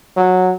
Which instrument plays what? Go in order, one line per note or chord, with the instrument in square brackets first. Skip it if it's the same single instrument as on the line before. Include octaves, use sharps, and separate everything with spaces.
[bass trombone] F#3